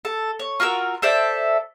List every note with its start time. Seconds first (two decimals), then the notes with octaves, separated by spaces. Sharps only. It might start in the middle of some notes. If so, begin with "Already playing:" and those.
0.05 A4
0.39 C#5
0.60 F4 F#4 A#4 E6
1.02 A4 C5 D5 E5